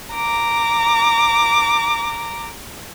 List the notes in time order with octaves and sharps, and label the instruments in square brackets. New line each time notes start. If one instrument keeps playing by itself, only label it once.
[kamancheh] A#5 D6